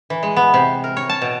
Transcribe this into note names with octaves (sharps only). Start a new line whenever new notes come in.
E3
G#3
B3
C3
A#4
C#5
A5
B2